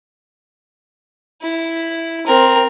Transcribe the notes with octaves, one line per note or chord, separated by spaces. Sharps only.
E4
C4 A#4